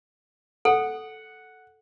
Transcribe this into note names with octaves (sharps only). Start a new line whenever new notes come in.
A4 F#5